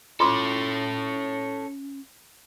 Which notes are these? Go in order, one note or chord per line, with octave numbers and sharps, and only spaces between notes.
C#4 F4 A4 C#5 C6 D6